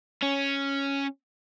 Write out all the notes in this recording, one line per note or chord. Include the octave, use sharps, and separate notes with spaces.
C#4